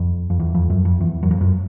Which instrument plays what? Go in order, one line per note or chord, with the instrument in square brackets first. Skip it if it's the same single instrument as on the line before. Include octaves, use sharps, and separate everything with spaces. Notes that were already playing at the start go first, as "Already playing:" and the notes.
Already playing: [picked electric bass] F2
F2
E2
F2
F#2
F2
E2
F#2
F2
F#2